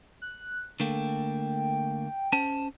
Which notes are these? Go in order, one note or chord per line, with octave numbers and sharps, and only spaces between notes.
F#6
D3 A3 A#3 G5
C#4 C5 A5